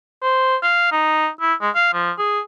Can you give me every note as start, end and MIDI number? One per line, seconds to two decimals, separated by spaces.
0.22 0.56 72
0.63 0.89 77
0.92 1.28 63
1.41 1.54 64
1.61 1.70 56
1.75 1.90 77
1.93 2.12 53
2.18 2.40 68